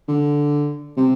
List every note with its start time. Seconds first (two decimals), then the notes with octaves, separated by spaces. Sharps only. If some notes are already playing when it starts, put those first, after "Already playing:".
0.08 D3
0.97 C3